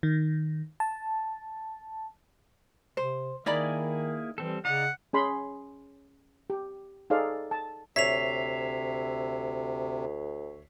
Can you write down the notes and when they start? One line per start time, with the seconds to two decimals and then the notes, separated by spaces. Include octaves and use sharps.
0.03 D#3
0.80 A5
2.97 C3 C5
3.46 D#3 A#3 D#4 E4 G#4 D5 B5
4.38 E3 G3 C4 A4
4.65 C#3 D#4 D5 F#5 A#5
5.13 C#4 G#4 B5 C6
6.50 G4
7.10 D#4 G#4 A4 C5 D5 F5
7.51 A5
7.96 D2 C3 C#5 E5 B6 C7 F7